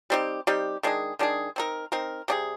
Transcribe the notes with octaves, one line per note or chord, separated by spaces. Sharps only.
G3 C4 D#4 G4
G3 C4 D#4 G4
D#3 G#3 D4 G#4
D#3 G#3 D4 G#4
C4 D#4 A#4
C4 D#4 A#4
C3 G3 D4 G#4